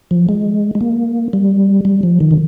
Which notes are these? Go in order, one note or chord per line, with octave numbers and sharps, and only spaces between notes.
F3
G#3
G#3
A#3
G3
G3
F3
D#3
D3